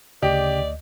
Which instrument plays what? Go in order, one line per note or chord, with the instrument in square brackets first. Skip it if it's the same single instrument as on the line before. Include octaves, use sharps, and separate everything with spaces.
[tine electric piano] D2 D#5 [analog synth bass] C#3 [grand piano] G4 [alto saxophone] D5